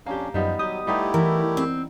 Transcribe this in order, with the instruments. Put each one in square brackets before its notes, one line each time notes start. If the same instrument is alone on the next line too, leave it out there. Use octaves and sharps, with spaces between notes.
[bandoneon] F2 C#4 D4 [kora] A#3 G4
[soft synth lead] F#2 [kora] D#3 G3 B3 [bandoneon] F3
[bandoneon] F#3 [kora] G4 [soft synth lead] D#6
[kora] G3 B3 D#4 [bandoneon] A3 E4 G4
[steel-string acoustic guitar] E3 [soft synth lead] A#4
[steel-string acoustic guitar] C4